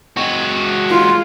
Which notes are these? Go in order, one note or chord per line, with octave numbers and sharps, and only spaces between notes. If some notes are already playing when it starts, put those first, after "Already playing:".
G#3 F#4
F4